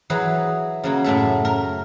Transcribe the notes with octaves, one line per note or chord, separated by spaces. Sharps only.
E3 F#3 G#4 B4
C#3 F#3 A#3
F#2 A2 A3 E5
A#4